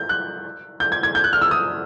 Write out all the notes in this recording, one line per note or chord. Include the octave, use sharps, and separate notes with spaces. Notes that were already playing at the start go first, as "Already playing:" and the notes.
Already playing: G6
F#6
G6
G#6
G#6
G6
F#6
F6
E6
D#6